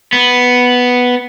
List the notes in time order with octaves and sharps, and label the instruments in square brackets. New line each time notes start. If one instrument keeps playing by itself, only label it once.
[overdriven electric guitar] B3